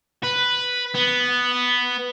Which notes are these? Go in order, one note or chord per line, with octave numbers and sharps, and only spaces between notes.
B4
B3